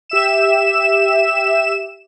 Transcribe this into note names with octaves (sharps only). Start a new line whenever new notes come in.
G4 E5 E7